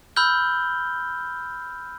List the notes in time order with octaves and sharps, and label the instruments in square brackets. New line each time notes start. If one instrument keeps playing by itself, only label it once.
[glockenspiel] B5 E6 F6 G6 G7